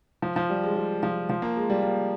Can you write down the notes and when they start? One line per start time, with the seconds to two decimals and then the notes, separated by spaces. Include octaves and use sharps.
0.22 F3
0.36 F3
0.50 G3
0.64 G#3
0.76 G3
1.03 F3
1.30 F3
1.42 A#3
1.57 G#3
1.70 G3
1.83 A#3